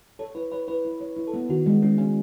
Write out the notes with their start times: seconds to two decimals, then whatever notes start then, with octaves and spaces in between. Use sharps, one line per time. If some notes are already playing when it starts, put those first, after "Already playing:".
0.19 A4 C#5
0.35 E4 B4
0.52 B4 C#5
0.68 E4 B4
0.85 E4
1.01 C#5
1.16 E4
1.27 A4
1.34 B3
1.49 D#3 F#4
1.66 G#3
1.82 G#3 C#4
1.98 C#4